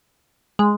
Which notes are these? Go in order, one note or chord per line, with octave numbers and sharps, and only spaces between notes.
G#3